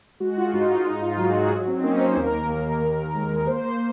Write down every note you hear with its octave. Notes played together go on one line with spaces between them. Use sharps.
G#3 F#4
F4
G#2 D#4
F4
G#2 D#4
F4
F#3 F#4
G#4
F#4
F#3
C4
D#4
A#3 C#4
C5
D#2 A#4
D#2
D#2
G#3
A#4
A#3 C5